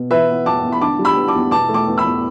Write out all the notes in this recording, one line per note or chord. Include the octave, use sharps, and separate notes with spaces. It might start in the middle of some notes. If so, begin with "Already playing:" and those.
Already playing: B2
E3 B4 E5
B3
E2 A5 D6
E2
B5
D3 A5 D6
G3
B5 E6
B3
A5 D6
E2
B2 A5 D6
A3
A5 D6
E2
B5 E6
E2